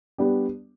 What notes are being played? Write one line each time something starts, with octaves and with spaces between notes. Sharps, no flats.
G3 B3 D4 G4